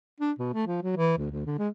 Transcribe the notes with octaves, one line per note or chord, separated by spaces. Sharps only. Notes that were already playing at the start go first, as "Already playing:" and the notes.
D4
B2
A3
F3
F#3
E3
D2
D2
D3
G#3